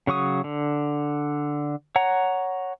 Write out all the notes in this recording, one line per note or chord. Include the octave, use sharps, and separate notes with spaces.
C#3 F#3 C#6 D#6
D3
C#5 F#5 A#5